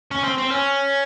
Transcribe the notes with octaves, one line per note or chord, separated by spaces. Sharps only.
C#4
C4
C4
C#4